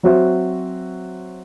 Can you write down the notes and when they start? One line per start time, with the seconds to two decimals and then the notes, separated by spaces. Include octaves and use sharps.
0.03 F#3 C4 F#4 C5 E5